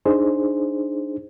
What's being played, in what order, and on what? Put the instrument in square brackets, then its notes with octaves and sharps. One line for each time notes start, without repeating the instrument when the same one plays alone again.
[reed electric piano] D4 D#4 G#4 C5